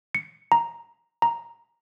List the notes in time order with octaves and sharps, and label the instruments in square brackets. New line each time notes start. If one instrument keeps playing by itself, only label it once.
[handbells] C#7
A#5
A#5